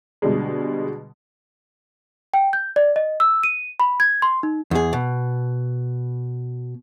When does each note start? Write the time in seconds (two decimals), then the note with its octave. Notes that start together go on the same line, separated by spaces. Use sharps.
0.22 B2 D3 G3 G#3
2.34 G5
2.53 G6
2.76 D5
2.96 D#5
3.20 E6
3.44 D#7
3.80 B5
4.00 G#6
4.22 C6
4.43 D#4
4.71 E2 G#4
4.93 B2